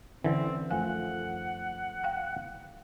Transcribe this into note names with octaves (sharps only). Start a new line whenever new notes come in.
D3 E3 C4 C#4
F#2 D#3 F3 A3 F5 F#5 G#5
F5 G5 F#6